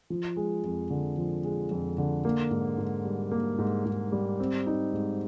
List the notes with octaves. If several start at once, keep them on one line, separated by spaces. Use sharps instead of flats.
F3
G#3
F2
D3
F3
G#3
F2
D3
A#3
G#2
G#2
G3
A#3
G#2
G#2
G3
C4
D#4
G#2